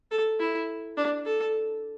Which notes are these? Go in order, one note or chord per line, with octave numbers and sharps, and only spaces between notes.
A4
E4
D4
A4